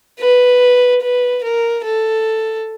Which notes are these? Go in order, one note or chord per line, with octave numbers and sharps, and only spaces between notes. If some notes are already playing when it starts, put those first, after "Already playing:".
B4
B4
A#4
A4